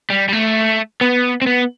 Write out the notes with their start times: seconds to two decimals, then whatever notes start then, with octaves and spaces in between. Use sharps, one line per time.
0.10 G3
0.29 G3
0.33 A3
1.01 B3
1.42 C4
1.46 B3